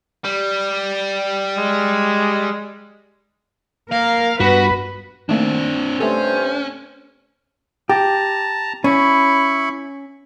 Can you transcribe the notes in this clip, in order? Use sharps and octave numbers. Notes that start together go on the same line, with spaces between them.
G3
G#3
A#3 A#4 F5
G2 B3 F#4 B4
D#3 A3 A#3 C4 D4
G2 C3 A3 C#4 A4 C5
G4 A5 A#5
C#4 E4 B5 C#6